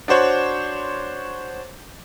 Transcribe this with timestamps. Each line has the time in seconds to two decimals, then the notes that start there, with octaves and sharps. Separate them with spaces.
0.08 D4 F#4 C5 C#5